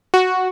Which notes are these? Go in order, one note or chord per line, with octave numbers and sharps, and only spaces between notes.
F#4